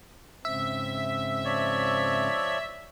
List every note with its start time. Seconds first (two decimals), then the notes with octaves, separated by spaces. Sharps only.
0.45 G#2 C#3 C4 E5
1.45 F3 C#5 D5